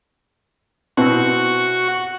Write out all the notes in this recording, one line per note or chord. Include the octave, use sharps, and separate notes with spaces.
B2 C4 E4 F#4 C#6